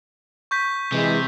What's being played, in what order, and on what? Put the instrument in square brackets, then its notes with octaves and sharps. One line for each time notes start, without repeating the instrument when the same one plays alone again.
[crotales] C#6 G6 B6
[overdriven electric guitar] C3 [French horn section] E3 G#3